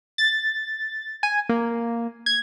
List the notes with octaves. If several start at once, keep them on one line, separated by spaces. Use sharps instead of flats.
A6
G#5
A#3
G#6